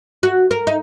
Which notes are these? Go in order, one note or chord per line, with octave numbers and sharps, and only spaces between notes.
F#4
A#4
D#4